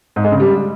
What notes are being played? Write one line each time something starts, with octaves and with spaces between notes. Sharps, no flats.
G#2
G#3
C#3
G3